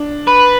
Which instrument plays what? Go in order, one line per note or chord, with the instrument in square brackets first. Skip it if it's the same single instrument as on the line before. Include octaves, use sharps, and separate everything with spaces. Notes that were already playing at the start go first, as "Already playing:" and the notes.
Already playing: [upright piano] D4
[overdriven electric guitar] B4